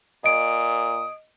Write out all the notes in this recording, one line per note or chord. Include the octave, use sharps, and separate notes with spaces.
A#2 D#5 D#6 D7